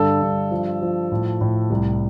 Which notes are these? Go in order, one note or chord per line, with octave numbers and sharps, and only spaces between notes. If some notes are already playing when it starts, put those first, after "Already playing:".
Already playing: G2 D3 A4
G2
F3
F3
A2
A2
C2